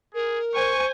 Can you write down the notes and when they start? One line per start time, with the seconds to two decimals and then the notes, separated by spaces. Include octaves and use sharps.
0.15 G#4 A#4
0.54 C5 G#5 C#6